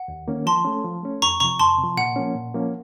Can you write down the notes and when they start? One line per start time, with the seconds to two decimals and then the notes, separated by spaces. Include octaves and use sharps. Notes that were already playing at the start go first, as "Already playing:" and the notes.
Already playing: F#5
0.08 D#2
0.28 D#3 A#3 C#4
0.46 F3 A5 C6
0.65 A3 C#4
0.85 F3
1.03 A3 C#4
1.22 F2 A#5 C#6
1.40 C3 F3 A#5 C#6
1.59 F2 A5 C6
1.78 C3
1.84 F3
1.97 A#2 F#5
2.16 F3 A#3 C#4
2.35 A#2
2.54 F3 A#3 C#4